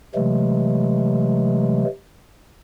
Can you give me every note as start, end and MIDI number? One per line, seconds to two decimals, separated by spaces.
0.15 1.84 48
0.15 1.84 52
0.15 1.84 54
0.15 1.84 56
0.15 1.84 57